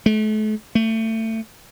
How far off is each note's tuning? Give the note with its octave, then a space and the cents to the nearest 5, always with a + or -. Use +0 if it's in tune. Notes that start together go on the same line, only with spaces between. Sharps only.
A3 -40
A3 +25